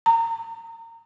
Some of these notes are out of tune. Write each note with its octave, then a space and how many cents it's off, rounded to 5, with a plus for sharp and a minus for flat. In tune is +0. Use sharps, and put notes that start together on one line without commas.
A#5 -25